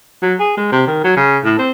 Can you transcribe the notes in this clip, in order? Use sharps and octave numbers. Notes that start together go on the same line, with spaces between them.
F#3
G#4
G#3
C3
D#3
F#3
C#3
A2
C4